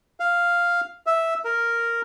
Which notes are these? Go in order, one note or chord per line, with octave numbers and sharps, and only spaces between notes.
F5
E5
A#4